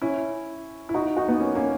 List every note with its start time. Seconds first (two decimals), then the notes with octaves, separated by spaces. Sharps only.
0.02 C#4 E4
0.89 E4
0.94 D#4 F#4
1.17 D#4 F#4
1.28 B3 D#4
1.40 A#3 C#4
1.55 A#3 C#4